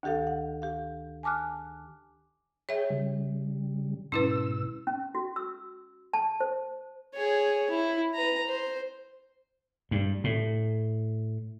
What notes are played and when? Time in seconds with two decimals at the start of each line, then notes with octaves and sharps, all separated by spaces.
0.03 D2 D#3 G4 A4 F5
0.27 F#5
0.62 G4 F5
1.23 G#5 A5 D6 F6 F#6
2.69 G#4 C#5 E5 G5
2.90 C#3 G3
4.12 G#2 B2 C#4 E4 B4 E6
4.87 C#4
5.15 F#4
5.36 E6
6.13 A5
6.40 C5
7.14 G#4 C#5
7.70 E4
8.14 B4 A#5
8.47 C5
9.91 G2
10.24 A2